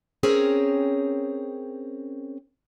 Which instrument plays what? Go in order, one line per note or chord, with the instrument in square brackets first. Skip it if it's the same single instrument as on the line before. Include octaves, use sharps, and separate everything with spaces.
[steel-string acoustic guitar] C4 C#4 G#4 A#4 G5